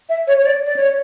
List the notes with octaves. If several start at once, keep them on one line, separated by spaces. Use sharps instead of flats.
E5
C#5
C#5
D5
D5
C#5